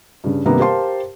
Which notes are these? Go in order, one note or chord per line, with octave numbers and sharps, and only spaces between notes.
G2 C#3
G2 C3 D#3 A#3 B3 A#5
G4 A#4 C5 F5 A5 C6